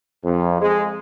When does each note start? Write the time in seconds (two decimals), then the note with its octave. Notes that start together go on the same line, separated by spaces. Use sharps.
0.23 F2
0.59 G#3